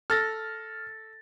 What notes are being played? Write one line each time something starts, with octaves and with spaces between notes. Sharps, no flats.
A4 F6 A6 A#6